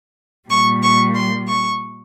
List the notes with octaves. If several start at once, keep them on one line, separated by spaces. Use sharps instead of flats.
A#2 G3 C#6
C#6
C6
C#6